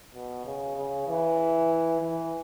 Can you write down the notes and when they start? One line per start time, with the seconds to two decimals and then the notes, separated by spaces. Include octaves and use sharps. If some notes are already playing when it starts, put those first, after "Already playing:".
0.15 B2
0.45 C#3
0.76 C#3
1.08 E3
2.01 E3